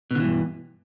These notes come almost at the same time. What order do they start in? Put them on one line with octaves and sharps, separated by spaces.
B2 D3 E3 G2